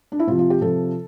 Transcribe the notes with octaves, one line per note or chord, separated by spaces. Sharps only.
D4
E4
C3 F3 F4
F4
G4
C3 F3 A4